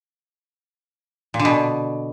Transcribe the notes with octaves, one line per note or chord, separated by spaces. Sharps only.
A#2
D3
B2